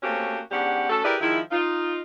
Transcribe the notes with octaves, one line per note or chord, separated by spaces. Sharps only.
A3 A#3 C4 C#4 F#4 G4
G#2 B3 C#4 D4 G4 F#5
A3 C#4 F#4 A4
E4 G4 G#4 A#4 B4 D5
D#3 F3 G#3 E4
D#4 F4